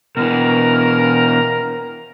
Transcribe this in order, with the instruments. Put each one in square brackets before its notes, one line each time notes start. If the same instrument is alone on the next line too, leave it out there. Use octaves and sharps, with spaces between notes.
[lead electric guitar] B2 E3 [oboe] A#4